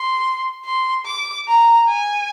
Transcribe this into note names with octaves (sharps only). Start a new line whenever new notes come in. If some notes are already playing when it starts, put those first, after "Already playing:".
Already playing: C6
C6
D6
A#5
G#5